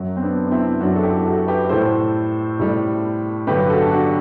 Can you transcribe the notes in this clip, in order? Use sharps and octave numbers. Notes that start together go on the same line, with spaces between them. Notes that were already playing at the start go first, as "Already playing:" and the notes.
Already playing: F#2 F#3
C4
B3 D4
D4
C4 E4
F#2 F#3 D4 F#4
A4
E4 G4
F#4 A4
G4 B4
A2 G3 A4 C5
A2 G3
G2 D3 F#3 G4 B4
F#4 A4
G4
D4 F#4